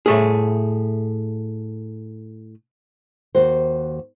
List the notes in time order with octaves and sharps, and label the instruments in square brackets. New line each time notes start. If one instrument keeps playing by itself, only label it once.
[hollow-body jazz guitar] A2 A3 G#4
[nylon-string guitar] D#2 F#4 C5